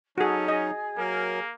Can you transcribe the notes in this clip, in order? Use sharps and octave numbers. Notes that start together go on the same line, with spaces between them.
F#3 C#4 D#4 F#4 G#4 A4
G#4 D#5
F#3 A#3 A#4